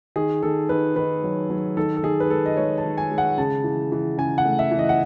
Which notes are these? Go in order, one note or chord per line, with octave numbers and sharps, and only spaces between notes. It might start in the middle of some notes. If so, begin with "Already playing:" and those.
D#3 G#4
D#3 A4
D#3 B4
D#3 B4
F#3
F#3
D#3 A4
A4
D#3 G#4
B4
G#3 A4
D#5
G#3 C#5
A5
D#3
G#5
G#3
F#5
C#3 A5
E3
E3
C#3 G#5
F#5
A3
E5
E3
D#5
F#5